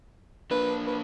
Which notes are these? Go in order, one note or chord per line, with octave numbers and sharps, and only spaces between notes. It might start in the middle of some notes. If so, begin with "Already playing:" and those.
A#3 D4 B4
B4